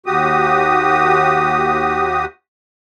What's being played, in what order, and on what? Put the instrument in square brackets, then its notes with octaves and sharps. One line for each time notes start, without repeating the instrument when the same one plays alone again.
[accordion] D#2 F#4 G4 D#6